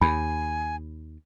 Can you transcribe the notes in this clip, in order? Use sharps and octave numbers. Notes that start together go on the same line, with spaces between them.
D#2 G#5 B5